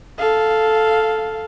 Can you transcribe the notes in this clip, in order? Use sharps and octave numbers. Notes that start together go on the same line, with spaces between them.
A4 F5